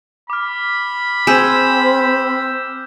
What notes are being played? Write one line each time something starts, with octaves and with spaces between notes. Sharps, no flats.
B5 D6 F6
C4 G#4 E6 G6 E7